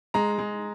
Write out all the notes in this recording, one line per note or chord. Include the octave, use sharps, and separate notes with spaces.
G#3 A#5
G#3